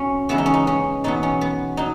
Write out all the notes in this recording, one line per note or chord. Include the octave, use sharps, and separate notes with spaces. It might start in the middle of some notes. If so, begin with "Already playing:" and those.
Already playing: B2 F#3 C#4
C#3 E3 G#3 B3 E4
D#4
C#4
D#4
C#4
E2 B2 F#3 B3 D#4
C#4
B3
F#3 D#4